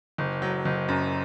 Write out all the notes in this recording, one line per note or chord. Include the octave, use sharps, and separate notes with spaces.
F#1
F#3
F#1
F#2